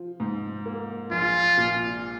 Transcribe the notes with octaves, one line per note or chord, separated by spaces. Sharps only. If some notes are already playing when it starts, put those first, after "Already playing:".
Already playing: F3
G#2
A#3
A#1 F4
A#2